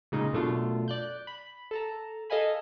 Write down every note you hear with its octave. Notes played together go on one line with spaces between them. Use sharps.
A#2 C#3 G#3 D#4
F#2 B2 A3 D4 F4
D5 F#6 G6
B5
A4 A5 A#5
A4 D#5 F5 G#5 B5